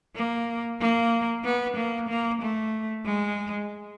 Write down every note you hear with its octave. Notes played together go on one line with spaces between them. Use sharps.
A#3
A#3
B3
A#3
A#3
A3
G#3